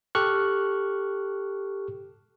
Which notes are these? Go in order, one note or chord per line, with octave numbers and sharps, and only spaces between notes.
G4 A4 C#6 F6 F#6